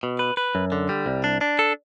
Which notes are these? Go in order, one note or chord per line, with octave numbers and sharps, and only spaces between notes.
B2
B4
B4
F#2
D3
G3
C2
D4
D4
A4